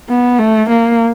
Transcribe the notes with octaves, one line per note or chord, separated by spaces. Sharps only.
B3
A3
A#3